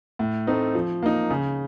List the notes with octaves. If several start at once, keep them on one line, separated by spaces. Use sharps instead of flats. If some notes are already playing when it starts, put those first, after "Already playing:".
A2
A3 C4 D#4
F3
A#3 D#4
C#3